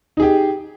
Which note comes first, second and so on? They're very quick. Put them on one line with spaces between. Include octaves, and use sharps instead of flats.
D#4 G#4 G4